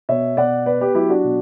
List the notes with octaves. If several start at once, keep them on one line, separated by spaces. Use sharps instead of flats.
B2 C#5 E5
B2 D5 F#5
B3 B4 D5
G4 B4
F#3 E4 G4
D4 F#4
B2